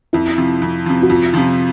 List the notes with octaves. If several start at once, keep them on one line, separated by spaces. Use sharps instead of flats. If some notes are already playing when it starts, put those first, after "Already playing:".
F2 E4
C3 F3
F2
C3 F3
F#4
F2 F4
C3 F3